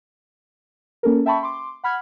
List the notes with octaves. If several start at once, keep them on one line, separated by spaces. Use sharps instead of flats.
A#3 C#4 A4 A#4
E5 G5 A5 B5 C#6
C6 D6
F#5 B5 F6 G#6